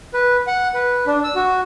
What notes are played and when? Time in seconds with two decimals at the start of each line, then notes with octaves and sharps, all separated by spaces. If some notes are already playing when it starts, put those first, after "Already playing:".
0.14 B4
0.47 F#5
0.74 B4
1.07 D4
1.24 E6
1.35 F#4